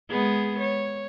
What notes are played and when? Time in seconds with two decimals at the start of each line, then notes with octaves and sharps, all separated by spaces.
0.10 G#3 B3 G#4
0.60 C#5